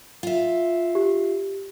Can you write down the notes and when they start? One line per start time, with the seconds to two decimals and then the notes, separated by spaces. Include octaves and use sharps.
0.23 F4 E5
0.95 G4